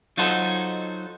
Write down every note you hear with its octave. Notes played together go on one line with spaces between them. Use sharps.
F#3 D#4 F4 F#4 A4 C5